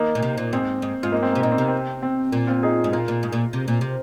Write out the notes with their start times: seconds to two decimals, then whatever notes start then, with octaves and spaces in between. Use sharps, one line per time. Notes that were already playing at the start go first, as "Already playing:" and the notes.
Already playing: D#3 A#3 D#4
0.15 A#2
0.22 C3
0.38 A#2
0.53 G#2 C4
0.82 G#2
1.03 G#2 F4
1.12 A#3 D#4
1.23 C4
1.32 C3 A#3
1.42 A#2 D#4
1.52 C4
1.58 C3 A#3
1.68 C4
2.03 C4
2.32 A#2
2.47 C4 F4
2.63 D#4 G#4
2.84 G#2
2.93 A#2 F4 A#4
3.08 A#2
3.23 G#2
3.33 A#2
3.53 C3
3.68 A#2
3.81 C3